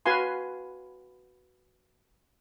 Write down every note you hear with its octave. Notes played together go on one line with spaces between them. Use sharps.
F#4 B4 F5 G#5 C6